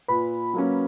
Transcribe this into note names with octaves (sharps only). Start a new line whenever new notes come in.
A#2 B4 B5
F#3 A#3 C#4